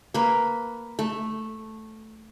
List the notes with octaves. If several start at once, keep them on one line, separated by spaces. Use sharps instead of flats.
A#3 B4
A3